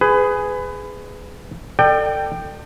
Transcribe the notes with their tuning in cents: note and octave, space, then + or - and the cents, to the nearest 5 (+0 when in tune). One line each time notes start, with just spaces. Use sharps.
G#4 +0 B4 +25
A4 +30 D5 +35 G5 +0